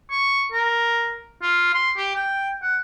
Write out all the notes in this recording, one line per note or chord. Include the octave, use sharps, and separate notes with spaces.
C#6
A#4
F4
C6
G4
G5
F#5